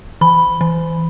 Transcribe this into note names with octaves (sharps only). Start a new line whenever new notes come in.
E3 B5
E3